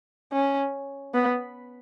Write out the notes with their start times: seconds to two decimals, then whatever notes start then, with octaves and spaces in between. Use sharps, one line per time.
0.33 C#4
1.15 B3